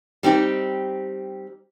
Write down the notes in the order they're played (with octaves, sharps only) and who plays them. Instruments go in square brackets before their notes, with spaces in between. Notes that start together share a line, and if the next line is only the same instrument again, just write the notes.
[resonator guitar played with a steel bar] G3 C4 D#4 G4